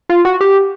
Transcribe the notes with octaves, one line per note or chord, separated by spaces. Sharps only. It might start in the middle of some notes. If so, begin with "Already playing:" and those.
F4
F#4
G4